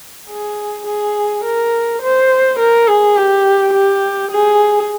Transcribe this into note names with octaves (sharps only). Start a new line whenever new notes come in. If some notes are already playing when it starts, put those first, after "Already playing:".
G#4
G#4
A#4
C5
A#4
G#4
G4
G4
G#4